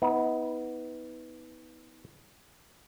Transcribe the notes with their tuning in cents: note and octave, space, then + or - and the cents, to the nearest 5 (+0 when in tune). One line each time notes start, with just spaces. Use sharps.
B3 +5 D#4 +40